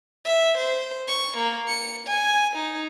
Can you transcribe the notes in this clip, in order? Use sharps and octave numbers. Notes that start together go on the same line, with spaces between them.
E5
C5
C#6
A#3
C#7
G#5
D#4